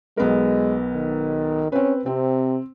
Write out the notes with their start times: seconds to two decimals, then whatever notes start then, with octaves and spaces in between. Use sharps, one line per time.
0.17 B1 G#3 B3 A#4
0.94 D#3
1.72 C4 C#4 B4
2.06 C3 C4